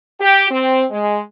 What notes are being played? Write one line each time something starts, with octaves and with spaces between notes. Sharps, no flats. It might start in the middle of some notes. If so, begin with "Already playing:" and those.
G4
C4
G#3